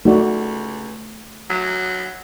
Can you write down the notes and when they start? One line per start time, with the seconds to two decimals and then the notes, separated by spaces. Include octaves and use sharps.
0.05 C#2 A3 D#4 F#4 D5
1.50 F#3